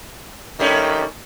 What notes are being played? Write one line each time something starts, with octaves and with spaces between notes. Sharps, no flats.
D#3 G3 A3 C#4